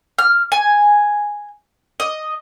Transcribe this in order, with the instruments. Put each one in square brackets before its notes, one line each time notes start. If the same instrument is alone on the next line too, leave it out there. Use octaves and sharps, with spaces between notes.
[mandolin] F6
G#5
D#5